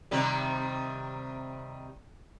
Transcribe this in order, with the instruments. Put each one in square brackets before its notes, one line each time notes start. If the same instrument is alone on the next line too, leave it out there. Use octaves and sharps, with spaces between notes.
[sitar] C3 D#3 G3